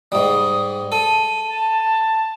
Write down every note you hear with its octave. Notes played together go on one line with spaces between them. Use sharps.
G#2 G3 D#6
A4 D#7
A5